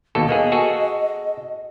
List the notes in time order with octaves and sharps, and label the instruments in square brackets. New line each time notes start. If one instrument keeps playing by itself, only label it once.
[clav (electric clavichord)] D#2 B2 A4 [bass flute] A#3
[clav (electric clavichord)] A#3 B3 G#4 [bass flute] D#5
[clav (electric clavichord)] F#4 G#4 A4